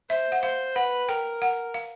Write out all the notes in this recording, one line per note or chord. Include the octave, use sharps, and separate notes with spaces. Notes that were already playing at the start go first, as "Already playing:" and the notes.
C5 E5
F#5
C5 F5
B4 F#5
A#4 G5
F#5
F5